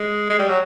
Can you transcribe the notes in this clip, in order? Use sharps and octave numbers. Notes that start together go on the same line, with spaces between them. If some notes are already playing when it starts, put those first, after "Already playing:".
Already playing: G#3
G#3
G3
F#3